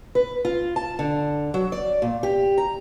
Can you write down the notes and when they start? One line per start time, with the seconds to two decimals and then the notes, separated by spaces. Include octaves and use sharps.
0.15 B4
0.45 F4
0.76 A5
0.99 D3
1.54 F#3
1.72 D5
2.02 A#2
2.23 G4
2.58 A#5